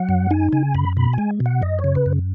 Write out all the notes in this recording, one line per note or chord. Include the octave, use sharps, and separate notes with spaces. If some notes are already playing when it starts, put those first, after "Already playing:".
Already playing: F#3 F#5
F#2
D#4 G#5
C#3 G#5
F#2 B5
B2 B5
G#3 G#5
B2
F#5
F#2 D#5
C#5
C#3
B4
F#2